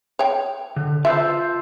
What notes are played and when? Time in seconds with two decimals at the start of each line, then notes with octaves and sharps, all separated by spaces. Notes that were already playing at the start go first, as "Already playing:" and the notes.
0.19 C#5 G5
0.76 D3
1.05 F4 A4 B4 C5 E5